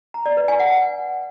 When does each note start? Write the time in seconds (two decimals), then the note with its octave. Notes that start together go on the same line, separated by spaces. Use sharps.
0.14 A#5
0.26 D5
0.37 B4
0.48 G#5
0.60 F#5